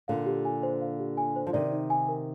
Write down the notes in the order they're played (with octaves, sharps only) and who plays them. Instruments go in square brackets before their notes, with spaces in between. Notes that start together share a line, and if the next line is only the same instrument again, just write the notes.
[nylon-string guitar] A#2 D3 [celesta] F5
[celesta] G4
G#5
C5
F5
G4
G#5
C5
[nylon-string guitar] F3
[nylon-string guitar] C3 D#3 [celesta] D5
[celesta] D#4
G#5
A#4